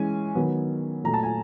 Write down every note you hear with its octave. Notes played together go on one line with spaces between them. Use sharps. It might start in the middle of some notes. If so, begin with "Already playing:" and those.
Already playing: E3 G#3 C#4 G#5
D#3 F#3 B3
A#2 F#3 A3 A#5
A5
G#5